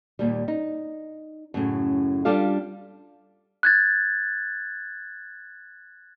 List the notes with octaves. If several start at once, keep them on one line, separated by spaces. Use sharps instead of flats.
D#2 A#2 G3
D#4
F#2 A2 C#3
G3 D4 F4 G4 A4 F5
F#6 G#6 A6